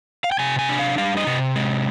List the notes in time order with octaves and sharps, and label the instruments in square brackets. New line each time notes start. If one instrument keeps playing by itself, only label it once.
[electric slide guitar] F5
G5
C3 G#5
G#5
D4
F5
G3 F5
D#5
C3
G#3